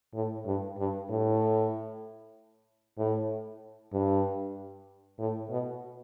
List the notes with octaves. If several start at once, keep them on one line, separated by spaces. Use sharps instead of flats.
A2
G2
G2
A2
A2
G2
A2
B2